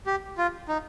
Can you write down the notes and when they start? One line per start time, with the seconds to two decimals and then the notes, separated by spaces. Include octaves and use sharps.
0.06 G4
0.38 F4
0.68 D#4